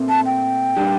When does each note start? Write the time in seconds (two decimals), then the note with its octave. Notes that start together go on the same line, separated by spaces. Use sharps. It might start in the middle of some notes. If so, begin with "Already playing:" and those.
Already playing: A#2 A3 C4
0.09 A5
0.26 G5
0.76 A#2 G3 D4 G4